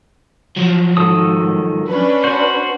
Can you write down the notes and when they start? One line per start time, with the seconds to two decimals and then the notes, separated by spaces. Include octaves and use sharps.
0.56 F3 F#3
0.97 G#2 D#3 A4 D#6
1.87 C#4 D4 B4
2.24 F#4 C5